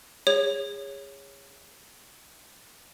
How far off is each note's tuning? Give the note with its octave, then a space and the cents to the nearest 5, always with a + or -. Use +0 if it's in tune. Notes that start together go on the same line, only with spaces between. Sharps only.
G#4 -30 C#5 +0